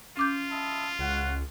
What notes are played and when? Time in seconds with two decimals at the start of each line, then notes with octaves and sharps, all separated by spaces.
0.17 C#4 F4 D6 G6
0.51 E4 D#5 A5
0.99 C#2 F#4 F#5